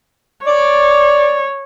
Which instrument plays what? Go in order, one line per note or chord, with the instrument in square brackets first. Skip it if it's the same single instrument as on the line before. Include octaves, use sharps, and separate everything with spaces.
[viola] C#5 [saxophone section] D5